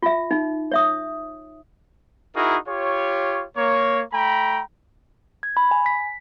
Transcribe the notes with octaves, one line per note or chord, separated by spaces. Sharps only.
F4 E5
D#4
C#5 E5 D#6
D#4 E4 F#4 G#4 A#4
F4 G4 C#5
A#3 C#5
A3 G5 A#5 B5
G#6
B5
G#5
B6